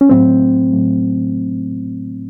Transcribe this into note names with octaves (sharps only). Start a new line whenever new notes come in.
C#4
A2 F#3 A3 C4
A2 F#3 A3